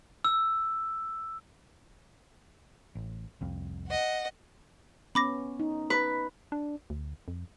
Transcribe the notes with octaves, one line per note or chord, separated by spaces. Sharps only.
E6
A1
C2 F2
D#5 F#5
B3 C#4 B5 D6 A#6
D#4
B4
D4
D2
F2